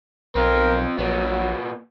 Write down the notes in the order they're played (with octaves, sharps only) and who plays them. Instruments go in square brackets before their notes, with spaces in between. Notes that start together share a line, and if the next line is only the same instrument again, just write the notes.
[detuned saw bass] B1 [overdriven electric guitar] C4 F4 [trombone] A#4
[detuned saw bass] A#1 [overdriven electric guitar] A#2 B3 [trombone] F#3